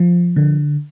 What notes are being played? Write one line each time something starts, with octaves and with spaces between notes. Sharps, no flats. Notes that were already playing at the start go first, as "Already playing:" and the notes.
Already playing: F3
D3